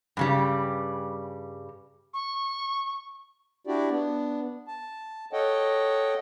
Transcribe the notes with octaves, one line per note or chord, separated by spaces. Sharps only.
G2 C#3 G3
C#6
D4 E4 F#4 G4 D5
B3 D4
A5
A4 C#5 D#5 F#5 G5